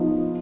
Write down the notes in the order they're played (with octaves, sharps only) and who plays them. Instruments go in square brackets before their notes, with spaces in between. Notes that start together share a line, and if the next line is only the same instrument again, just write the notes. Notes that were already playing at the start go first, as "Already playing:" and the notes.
Already playing: [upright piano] F3 B3 D#4